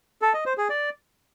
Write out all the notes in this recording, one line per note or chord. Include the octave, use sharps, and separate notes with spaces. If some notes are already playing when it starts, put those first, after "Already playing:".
A4
D#5
C5
G#4
D5